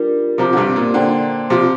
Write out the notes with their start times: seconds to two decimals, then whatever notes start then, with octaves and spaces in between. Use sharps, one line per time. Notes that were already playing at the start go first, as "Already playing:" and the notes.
Already playing: G3 D4 F4 A#4
0.38 C3 F3 C5 A#5 D6
0.53 D3
0.57 G2 C3
0.76 A#2
0.94 A#2 D3 C5 G5 A#5
1.50 C3 F3 C5 A#5 D6